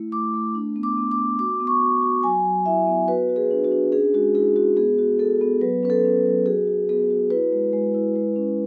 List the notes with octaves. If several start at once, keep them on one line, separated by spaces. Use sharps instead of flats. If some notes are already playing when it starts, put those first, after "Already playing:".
Already playing: A3 E4
A3 D6
A3
D4
B3
D6
B3
D6
B3
F#4 D6
B3
C#6
F#4
F#4
F#3 G#5
F#3
E4 E5
B3
F#4 B4
F#4
G#4
D4
F#4
D4
C#4 G#4
G#3 F#4
E4 G#4
G#3 F#4
B3 G#4
F#4
B3 A4
B3
F#3 B4
C#4 B4
A4
C#4
F#3
F#4 G#4
F#4
B3 G#4
F#4
E4 B4
G#3
G#3
E4
G#3
C#4